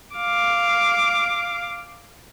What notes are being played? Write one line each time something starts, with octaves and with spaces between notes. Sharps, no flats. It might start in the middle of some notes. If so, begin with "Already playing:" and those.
F5 D6